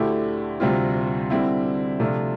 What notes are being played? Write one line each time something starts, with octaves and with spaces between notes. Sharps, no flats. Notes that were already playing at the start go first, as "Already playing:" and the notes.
Already playing: D2 D3 A3 E4 G4
D2 C3 G3 C4 F4
D3 G3 C4 E4
C3 F3 A3 D4 F4